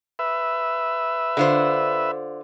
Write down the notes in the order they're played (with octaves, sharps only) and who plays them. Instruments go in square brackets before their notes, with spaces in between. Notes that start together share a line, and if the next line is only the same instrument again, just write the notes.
[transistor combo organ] B4 E5
[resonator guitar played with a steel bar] D3 F4 C5